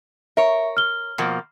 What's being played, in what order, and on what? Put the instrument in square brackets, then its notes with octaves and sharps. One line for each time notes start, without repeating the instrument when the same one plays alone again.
[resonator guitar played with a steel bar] A#4 C#5 [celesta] E5
[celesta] F6 G7
[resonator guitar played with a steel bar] B2 F3 A#3